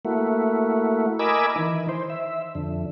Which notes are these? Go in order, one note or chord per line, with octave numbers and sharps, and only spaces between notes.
A3 A#3 E4 F#4
A#4 D#5 G#5 B5 D6 E6
D#3 E3
C5
E5
F2 D3